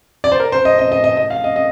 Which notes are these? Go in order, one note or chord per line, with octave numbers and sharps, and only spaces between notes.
D5
C5
A#4
C5
D#5
D#5
D#5
D#5
D#5
F5
D#5
D#5